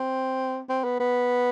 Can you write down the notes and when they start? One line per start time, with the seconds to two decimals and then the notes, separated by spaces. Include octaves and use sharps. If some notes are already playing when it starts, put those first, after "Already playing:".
Already playing: C4
0.69 C4
0.84 B3
1.00 B3